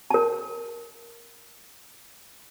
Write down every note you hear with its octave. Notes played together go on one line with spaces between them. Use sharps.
A#4 A5